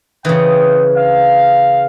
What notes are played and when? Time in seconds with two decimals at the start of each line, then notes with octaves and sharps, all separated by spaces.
0.25 C#3 E3 F4 G5 D#6
0.95 F5